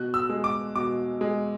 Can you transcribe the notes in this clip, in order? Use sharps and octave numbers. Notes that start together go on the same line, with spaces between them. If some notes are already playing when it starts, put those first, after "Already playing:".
Already playing: B2 F#6
E6
G#3
D6
B2 D6
G#3